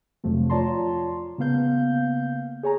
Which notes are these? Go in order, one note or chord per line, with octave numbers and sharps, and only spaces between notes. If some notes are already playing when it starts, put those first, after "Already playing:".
F2 C3 F3 F#3 A3
F4 C#5 D5 A5 A#5 C6
C#3 A#3 B3 F5 G6
G#4 C#5 G#5 A#5